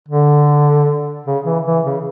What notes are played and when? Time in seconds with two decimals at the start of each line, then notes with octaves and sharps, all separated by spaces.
0.08 D3
1.26 C#3
1.45 E3
1.65 E3
1.85 C#3